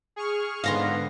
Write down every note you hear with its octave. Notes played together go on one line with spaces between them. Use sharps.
G#4 C#6 F6
G#2 D3 B3 F5 A#5 C6